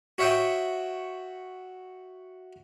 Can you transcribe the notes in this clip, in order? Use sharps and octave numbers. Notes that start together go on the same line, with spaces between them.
F#4 C#5 E5 F#5 G5 D#6